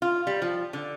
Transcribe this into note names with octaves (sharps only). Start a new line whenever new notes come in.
F4
G3
F3
D3